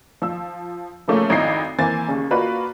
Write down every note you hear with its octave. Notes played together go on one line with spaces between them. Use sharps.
F3 E6
C#3 F3 A3 A#3 C#4
G#1 F2 D#4 E4 C7
E3 A#3 C4 G#5 A6
D#2 C#3
A#3 F4 F#4 B4 D5 F5